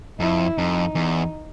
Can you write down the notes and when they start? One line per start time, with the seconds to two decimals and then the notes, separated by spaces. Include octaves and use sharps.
0.20 F2 E4
0.58 F2 D#4
0.95 E2